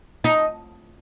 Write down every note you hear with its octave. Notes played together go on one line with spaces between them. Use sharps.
D#4